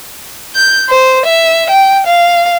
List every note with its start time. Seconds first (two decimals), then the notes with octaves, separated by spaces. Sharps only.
0.55 G6
0.89 C5
1.26 E5
1.70 G5
2.07 F5